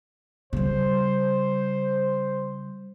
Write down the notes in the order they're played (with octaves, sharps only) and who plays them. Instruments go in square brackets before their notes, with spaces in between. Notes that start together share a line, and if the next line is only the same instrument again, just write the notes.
[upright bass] C#3 G3 [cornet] C5